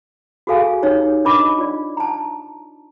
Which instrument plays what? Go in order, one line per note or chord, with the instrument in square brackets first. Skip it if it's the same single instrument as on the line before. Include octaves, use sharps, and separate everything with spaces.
[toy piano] F#4 G#4 A4 F5 G#5
D#4 G4 C#5
D4 A#4 D#5 B5 D6
F4 D5
A5 A#5